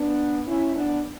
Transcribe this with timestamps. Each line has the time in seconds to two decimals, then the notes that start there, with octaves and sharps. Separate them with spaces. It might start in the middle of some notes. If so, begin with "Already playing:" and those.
Already playing: B3 D4
0.47 C#4 E4
0.75 B3 D4